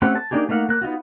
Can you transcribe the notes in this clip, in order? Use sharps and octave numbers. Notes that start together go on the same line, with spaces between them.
A3 C4 C#4 G4 F#5
A5
A#3 D4 D#4 G4 G#4
A3 A#3 D#4 F5 F#5
A#3 F#6
B3 D#4 F4 F#4